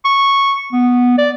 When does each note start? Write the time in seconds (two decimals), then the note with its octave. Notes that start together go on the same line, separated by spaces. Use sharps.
0.05 C#6
0.72 B3
1.18 D5